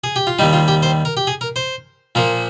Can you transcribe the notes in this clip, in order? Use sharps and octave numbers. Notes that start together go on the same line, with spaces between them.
G#4
G4
F4
D#2 D#3 G3 D#4
F4
G4
C5
A#4
G4
G#4
A#4
C5
A#2 F3 A#3 A#4